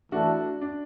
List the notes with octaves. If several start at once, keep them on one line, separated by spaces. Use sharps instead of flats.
E3 A3 D4 E4 F#4 A4 D5
D4